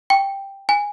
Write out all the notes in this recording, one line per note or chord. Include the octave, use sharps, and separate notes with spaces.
G5
G#5